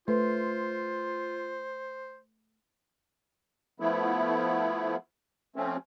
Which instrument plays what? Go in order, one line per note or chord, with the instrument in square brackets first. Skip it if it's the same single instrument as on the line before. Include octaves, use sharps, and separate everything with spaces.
[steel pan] A3 [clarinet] F4 [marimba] B4 [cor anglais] C5
[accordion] F3 A3 B3 E4
F3 A3 C4 C#4